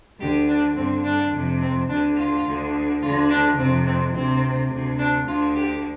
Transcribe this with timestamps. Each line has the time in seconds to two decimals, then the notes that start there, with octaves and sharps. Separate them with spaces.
0.20 D2 D3 G4
0.48 D4
0.76 G2 D3 C4
1.04 D4
1.32 F2 C3
1.61 C4
1.89 D2 D3 D4
2.17 F4
2.46 D2 D3
3.02 D2 D3 F4
3.30 D4
3.58 C3 C4
3.62 F2
3.86 C4
4.14 D2 C3 C4
4.71 D2 C3
4.99 D4
5.27 D2 D3 F4
5.55 G4